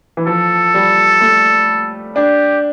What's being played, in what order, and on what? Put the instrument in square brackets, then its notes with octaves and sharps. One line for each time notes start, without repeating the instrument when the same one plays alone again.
[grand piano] E3
[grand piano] F3 [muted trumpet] A4
[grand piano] G3
A3
[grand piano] D4 [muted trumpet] G4